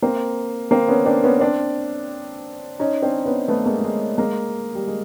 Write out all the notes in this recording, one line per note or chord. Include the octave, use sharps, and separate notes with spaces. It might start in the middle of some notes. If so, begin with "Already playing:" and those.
A#3 C4
A#3 C4
B3 C#4
C4 D4
B3 C#4
C4 D4
C#4 D#4
C4 D4
B3 C#4
A3 B3
G#3 A#3
A3
G#3
G#3 A#3
G3
G#3